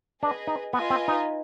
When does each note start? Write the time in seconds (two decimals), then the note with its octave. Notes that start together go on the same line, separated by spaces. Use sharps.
0.22 D4 G#4 B4 D#5
0.47 D#4
0.73 B3 F4 B4 D#5 G#5
0.90 C4
1.08 D#4